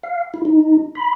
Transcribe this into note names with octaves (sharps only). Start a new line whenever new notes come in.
F5
E4
D#4
B5